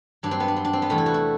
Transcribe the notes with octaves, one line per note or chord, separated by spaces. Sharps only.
G2 F#3 D4
C4
B3
D4
C4
D4
C4
B3
E2 C3 G3 A3
E4
F#4
E4